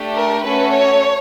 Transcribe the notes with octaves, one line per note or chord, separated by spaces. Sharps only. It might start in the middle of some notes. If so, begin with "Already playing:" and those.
Already playing: A3 D4 G4
A#4
A3 C#4 F#4 A4 B4
C#5